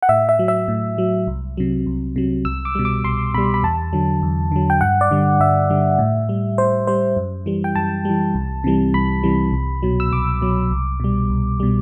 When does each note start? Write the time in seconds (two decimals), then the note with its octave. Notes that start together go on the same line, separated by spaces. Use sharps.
0.02 F#5
0.09 A2 E5
0.29 E5
0.39 F#3
0.48 E5
0.68 A2
0.98 F#3
1.27 C2
1.57 C3 F#3
1.86 C2
2.16 C3 F#3
2.45 C2 E6
2.65 D6
2.75 B2 G3
2.85 D6
3.04 C2 C6
3.34 B2 G3 B5
3.54 B5
3.63 E2 A5
3.93 D3 F#3
4.22 E2
4.52 D3 F#3
4.70 G5
4.81 G2 F#5
5.01 D5
5.11 D3 G3
5.40 G2 E5
5.70 D3 G3
5.99 A2
6.29 G3
6.58 A2 C5
6.87 G3 C5
7.17 F#2
7.46 E3 G3
7.64 G5
7.75 F#2 A5
8.05 E3 G3
8.34 C2
8.64 C3 E3 G3
8.94 C2 B5
9.23 C3 E3 G3
9.52 C2
9.83 B2 F#3
10.00 E6
10.12 C2 D6
10.42 B2 F#3
10.71 C2
11.00 B2 G3
11.30 C2
11.60 B2 G3